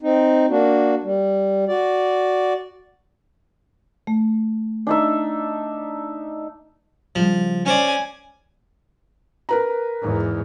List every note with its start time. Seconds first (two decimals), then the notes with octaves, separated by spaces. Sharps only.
0.02 C4 D#4
0.50 A#3 D4 F#4
1.04 G3
1.68 F#4 D5
4.07 A3
4.87 D4 D#4 E5
7.15 C#3 F3 G3
7.66 C#4 C5 D5 G#5
9.49 A#4 B4 A#5
10.00 E2 G#2